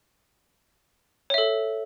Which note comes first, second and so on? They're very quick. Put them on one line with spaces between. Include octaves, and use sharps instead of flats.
C#5 E5 A4